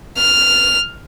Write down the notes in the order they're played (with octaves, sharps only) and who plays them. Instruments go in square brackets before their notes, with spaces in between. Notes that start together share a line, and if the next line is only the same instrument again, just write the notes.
[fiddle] F6